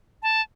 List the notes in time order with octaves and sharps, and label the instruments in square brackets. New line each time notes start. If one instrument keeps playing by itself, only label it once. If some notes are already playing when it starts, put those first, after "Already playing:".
[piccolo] A5